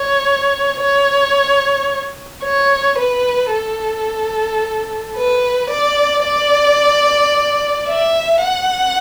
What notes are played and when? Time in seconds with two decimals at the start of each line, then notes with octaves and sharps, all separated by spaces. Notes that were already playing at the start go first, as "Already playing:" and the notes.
Already playing: C#5
0.81 C#5
2.44 C#5
2.98 B4
3.53 A4
5.16 B4
5.70 D5
6.24 D5
7.88 E5
8.42 F#5